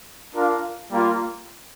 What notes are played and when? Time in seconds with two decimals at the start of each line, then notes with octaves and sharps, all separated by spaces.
0.34 D4 F4 A#4 F5
0.91 G3 A#3 F4